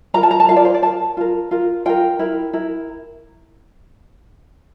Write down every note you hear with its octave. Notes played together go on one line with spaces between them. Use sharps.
F4 A#4 A#5
A5
A#5
A5
F4 A#4 F5
D5
C5
D5
F4 A#4 A5
F4 A#4
F4 A#4
F4 A#4 G5
E4 A#4
E4 A#4